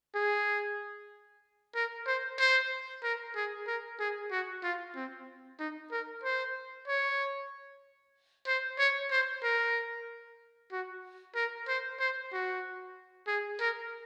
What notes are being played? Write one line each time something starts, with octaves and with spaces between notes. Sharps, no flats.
G#4
A#4
C5
C5
A#4
G#4
A#4
G#4
F#4
F4
C4
D#4
A#4
C5
C#5
C5
C#5
C5
A#4
F#4
A#4
C5
C5
F#4
G#4
A#4